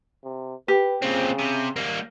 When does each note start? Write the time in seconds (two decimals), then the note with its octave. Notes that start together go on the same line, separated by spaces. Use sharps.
0.24 C3
0.68 G4 B4
1.02 A#2 C#3 C4
1.39 C3
1.76 G3 A#3